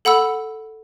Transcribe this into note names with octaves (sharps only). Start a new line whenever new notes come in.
A4 F#5 B5 E6